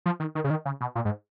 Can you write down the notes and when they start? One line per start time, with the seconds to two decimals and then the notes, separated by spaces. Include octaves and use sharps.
0.06 F3
0.20 D#3
0.35 D#3
0.44 C#3
0.50 D#3
0.65 C#3
0.81 B2
0.95 A#2
1.05 G#2